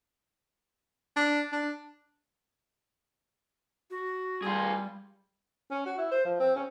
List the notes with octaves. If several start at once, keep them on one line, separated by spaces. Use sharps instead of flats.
D4
D4
F#4
G3 F4 G#4
C#4
F#4
E4
C5
F3
C4
C#4